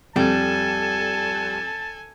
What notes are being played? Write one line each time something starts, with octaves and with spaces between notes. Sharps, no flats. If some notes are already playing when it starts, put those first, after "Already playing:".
F2 G3 A4 G#5 A5